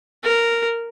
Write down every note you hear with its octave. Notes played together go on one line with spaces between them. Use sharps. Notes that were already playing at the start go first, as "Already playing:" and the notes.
A#4